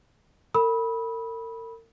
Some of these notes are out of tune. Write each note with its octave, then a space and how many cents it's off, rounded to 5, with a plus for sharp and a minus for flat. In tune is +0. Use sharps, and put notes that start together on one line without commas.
A#4 -40 B5 -15 E6 -45